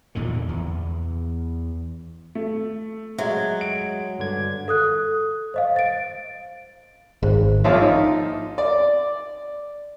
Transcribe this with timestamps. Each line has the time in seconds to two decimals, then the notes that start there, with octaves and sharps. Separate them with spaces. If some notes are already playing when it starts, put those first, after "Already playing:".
0.15 E2 A#2 D3 D#3
0.49 E2
2.35 A3
3.18 F#3 G#3 E5 G#6
3.61 D7
4.19 G2 D3 G#6
4.68 A4 D#6 F#6
5.54 C5 D#5 F5
5.76 A6 D7
7.23 G#1 G#4 C5
7.64 A#1 F3 F4 C#5 E5
7.81 D#4
8.58 D5